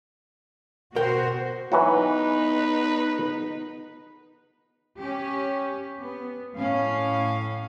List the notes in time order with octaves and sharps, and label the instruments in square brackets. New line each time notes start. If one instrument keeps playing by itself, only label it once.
[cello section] B2 F#4 C5 [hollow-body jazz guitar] A#4 G5
[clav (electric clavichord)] E3 F#3 F#4 [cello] B3 D#4 [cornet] B4
[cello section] C#4 G4
B3
A2 C#4 F5